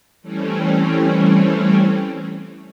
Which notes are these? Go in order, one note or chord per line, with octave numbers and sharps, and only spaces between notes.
E3 G3 A3 C4 C#4